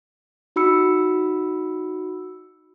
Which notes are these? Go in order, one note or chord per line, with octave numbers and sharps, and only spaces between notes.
D#4 F#4 B5 E6 C#7